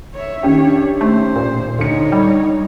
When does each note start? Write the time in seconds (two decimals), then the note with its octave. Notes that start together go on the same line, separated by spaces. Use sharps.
0.14 C#5 E5
0.43 D#3 C#4 D4 G4 C#5
1.01 A3 C5
1.36 A#2
1.79 D2 D#4 C#5 C#7
2.12 G3